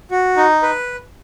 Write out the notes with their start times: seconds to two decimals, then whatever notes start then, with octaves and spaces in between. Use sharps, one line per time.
0.11 F#4
0.37 D#4
0.62 B4